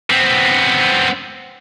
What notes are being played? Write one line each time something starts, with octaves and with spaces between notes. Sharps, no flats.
B3 C4